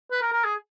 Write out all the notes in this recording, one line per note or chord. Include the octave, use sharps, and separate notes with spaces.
B4
A#4
A#4
G#4